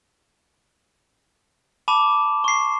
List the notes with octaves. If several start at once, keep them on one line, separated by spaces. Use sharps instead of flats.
A5 B5 D6 E7
C#6 C7